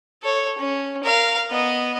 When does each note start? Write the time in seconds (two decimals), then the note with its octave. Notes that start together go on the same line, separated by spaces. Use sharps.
0.23 A4 C#5
0.58 C#4
1.03 A#4 F5
1.50 B3 D#5